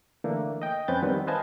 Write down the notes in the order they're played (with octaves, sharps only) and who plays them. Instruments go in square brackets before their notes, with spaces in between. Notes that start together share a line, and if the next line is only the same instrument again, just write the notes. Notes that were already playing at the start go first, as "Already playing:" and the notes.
[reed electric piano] D3 E3 A3 A#3 D4
D#5 G5
F2 C4 C#4 B4 G6 A6
D#3 G3 B3 C4
B4 C5 D#5 F5 G#5 A5